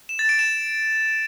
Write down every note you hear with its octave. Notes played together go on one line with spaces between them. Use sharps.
E7
A6
D7
E7